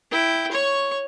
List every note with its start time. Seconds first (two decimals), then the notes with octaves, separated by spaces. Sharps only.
0.11 E4 G5
0.52 C#5 C#6